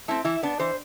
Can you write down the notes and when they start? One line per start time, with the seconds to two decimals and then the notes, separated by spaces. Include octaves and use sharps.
0.08 A3 C4 E4
0.25 E3 E4
0.43 B3 D4
0.60 E3 C5